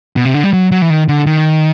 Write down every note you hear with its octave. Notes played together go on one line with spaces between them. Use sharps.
B2
C3
D3
G3
F#3
F#3
E3
D#3
D3
D#3